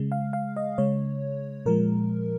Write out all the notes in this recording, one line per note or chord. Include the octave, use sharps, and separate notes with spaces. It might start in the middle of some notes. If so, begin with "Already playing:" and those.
Already playing: C#3 G#3
F5
F5
D#5
C#3 G#3 C#5
A#2 F3 G#3 A#4